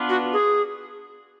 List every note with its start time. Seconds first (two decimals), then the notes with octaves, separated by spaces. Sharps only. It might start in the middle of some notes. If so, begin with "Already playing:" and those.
Already playing: B3 D4 F4 B4
0.09 F#4
0.33 G#4